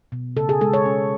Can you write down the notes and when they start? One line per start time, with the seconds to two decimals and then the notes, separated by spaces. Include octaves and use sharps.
0.12 B2
0.36 C#3 A4
0.49 G#4
0.61 G#3 A4
0.74 C#5
0.86 C#4